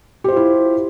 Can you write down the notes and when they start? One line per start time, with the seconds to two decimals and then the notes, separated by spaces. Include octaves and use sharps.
0.24 G4
0.28 C5
0.32 F4
0.36 E4